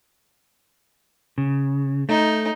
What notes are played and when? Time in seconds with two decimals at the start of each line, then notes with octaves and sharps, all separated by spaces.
1.38 C#3
2.09 A3 D#4